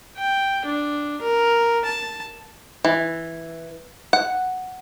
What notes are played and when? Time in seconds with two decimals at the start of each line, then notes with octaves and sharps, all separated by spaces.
0.17 G5
0.65 D4
1.21 A#4
1.85 A5
2.85 E3
4.13 F#5